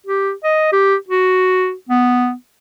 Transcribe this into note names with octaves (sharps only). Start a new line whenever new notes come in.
G4
D#5
G4
F#4
B3